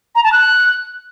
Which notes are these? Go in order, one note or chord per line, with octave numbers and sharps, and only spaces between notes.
A#5
A5
F#6